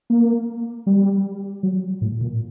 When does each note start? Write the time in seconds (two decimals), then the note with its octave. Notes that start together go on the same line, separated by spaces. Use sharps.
0.10 A#3
0.86 G3
1.63 F#3
2.01 A2
2.21 A#2